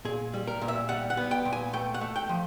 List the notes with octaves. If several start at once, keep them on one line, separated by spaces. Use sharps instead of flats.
A#2 G#4
G3
A#4
A#2
E5
G3 F#5
F#5
B3
G5
A#2
G#5
A3 G5
F#5
A3
G5
F3